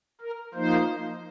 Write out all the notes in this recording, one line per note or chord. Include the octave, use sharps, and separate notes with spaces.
A#4
F3 A#3 D#4 C5